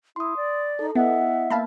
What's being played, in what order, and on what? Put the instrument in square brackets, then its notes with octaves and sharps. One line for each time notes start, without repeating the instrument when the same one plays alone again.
[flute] E4 [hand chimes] C6 D#6
[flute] D5
[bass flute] D#4 [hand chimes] A4
[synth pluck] B3 [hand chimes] E4 D#5 [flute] E5 [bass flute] F#5
[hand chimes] A#3 B3 [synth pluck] F5 A5 B5